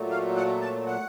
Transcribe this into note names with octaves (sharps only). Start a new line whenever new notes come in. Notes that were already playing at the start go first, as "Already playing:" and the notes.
Already playing: A#2 F#3 A3
F5
F#5
A5
F#5